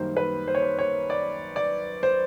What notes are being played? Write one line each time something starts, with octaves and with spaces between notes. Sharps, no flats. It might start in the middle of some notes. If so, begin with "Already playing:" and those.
Already playing: F#2 D#3 G3 A#3 C5
B4
C5
C#5
C5
C#5
D5
D5
C5